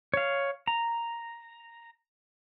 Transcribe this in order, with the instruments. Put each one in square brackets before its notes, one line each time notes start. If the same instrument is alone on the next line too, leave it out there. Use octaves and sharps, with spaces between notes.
[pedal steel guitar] C#5 F5
A#5